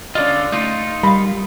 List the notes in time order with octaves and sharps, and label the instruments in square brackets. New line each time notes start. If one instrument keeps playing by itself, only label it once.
[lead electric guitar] D3 F4 [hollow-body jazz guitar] C#4 D5 D#5
[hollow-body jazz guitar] A3 [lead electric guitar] D#4 F4
[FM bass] G3 [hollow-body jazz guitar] A#4 F5 [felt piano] B5